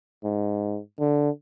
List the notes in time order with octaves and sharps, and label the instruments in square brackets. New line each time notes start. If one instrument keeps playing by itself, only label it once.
[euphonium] G#2
D3